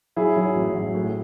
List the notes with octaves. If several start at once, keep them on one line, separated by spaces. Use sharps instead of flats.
F#3 E4 G#4
F#3
A1
F#3
A2